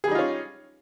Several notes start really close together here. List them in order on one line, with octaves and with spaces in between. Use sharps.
G#4 G3 D#4 F4 C#4